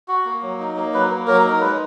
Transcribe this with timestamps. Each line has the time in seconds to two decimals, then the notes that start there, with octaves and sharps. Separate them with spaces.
0.08 F#4
0.26 A#3
0.42 F#3
0.60 D#4
0.76 A#3
0.94 F#3 B4
1.10 A#3
1.27 F#3 A#4
1.45 D#4
1.50 A#4
1.61 G#3 B4